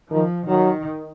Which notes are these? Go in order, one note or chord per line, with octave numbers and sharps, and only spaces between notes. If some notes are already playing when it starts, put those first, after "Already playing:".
D#3 F3
D#3 F#3